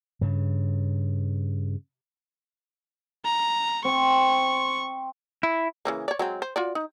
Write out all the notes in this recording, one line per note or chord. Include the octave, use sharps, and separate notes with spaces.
G2 C#3
A#5
C4 C#6
E4
C#3 E3 A#3
C#5 D5
F#3 G#3 C4
C5
F4 F#4 D5
D#4